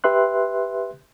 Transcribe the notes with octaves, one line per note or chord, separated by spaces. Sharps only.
G4 B4 E5 C6 F#6